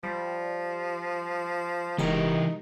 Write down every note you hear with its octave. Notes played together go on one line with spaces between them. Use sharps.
F3 G3
E1 E3 G#3 D#4 G4 A#4